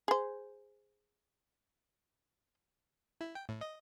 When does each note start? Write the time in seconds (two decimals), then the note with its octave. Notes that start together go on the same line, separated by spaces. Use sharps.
0.08 G#4 C5
3.21 E4
3.35 G5
3.49 A2
3.61 D#5